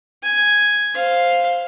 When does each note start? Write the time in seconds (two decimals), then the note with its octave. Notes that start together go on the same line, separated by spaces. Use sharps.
0.23 G#5
0.94 C5 F5